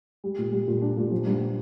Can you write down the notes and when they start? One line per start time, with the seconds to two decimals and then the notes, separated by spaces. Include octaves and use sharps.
0.24 G3
0.38 A#2
0.53 G3
0.68 A#2
0.82 D4
0.97 A#2
1.11 F3
1.26 G2